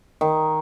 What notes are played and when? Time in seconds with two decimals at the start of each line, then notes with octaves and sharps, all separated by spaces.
0.21 D#3